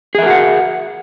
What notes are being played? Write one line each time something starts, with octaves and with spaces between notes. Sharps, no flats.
F#4 G#4 A#4 E5 F#5